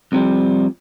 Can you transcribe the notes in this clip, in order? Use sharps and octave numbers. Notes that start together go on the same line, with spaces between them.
C2 C3 F3 G3